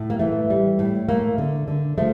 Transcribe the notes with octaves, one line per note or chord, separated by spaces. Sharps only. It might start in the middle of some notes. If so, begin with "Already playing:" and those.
Already playing: A2
A#3
E3 A3
G3
A2
A3 A#3
D3
D3
F3 A3